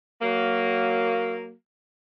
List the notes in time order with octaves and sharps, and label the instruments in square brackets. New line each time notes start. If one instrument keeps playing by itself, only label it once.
[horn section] F#3 A#3